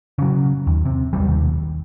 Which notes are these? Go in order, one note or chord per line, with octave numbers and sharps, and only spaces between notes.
C#3 F#3
D#2
C3
E1 B1 G3
D#2